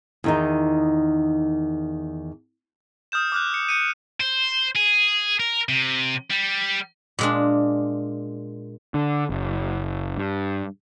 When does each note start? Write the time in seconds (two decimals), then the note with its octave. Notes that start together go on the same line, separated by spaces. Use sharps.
0.24 E2 D#3 D#4
3.12 D#6 F6 G6 E7
3.32 D6 F6 F#6
3.54 C#7
3.69 G6 C#7 D#7
4.20 C5
4.75 G#4
5.40 A#4
5.69 C3
6.30 G3
7.19 A#2 G#3 D4
8.94 D3
9.30 F#1
10.18 G2